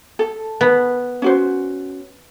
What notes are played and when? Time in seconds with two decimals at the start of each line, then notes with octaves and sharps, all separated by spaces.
0.19 A4
0.61 B3
1.22 C#4 F#4 C5